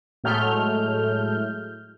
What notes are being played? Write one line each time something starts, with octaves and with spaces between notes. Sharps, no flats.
A2 F#3 G#3 A3 F6 G6